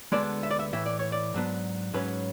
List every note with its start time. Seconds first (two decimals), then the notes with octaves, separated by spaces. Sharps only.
0.12 D2 D3 G#3 B3 D4 D5
0.43 E5
0.51 D5
0.59 E5
0.73 A2 E3 A3 E5
0.86 D5
0.99 C#5
1.12 D5
1.34 G#2 F#3 B3 D4
1.94 G#2 F#3 C#4 B4